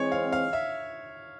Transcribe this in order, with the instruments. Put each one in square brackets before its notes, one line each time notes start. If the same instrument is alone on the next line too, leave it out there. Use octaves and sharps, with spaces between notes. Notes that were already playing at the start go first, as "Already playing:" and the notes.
Already playing: [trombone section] E3 G#3 C4 [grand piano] C#5
[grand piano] F5
F5
E5